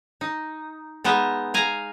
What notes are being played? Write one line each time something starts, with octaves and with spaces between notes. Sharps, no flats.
D#4
G#3 B3 D#4 D#5 E5
F5 G#5 A#5